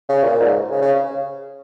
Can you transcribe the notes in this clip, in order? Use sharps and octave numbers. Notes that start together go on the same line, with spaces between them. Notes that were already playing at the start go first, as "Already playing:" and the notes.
C#3
A#2
G#2
C#3
C#3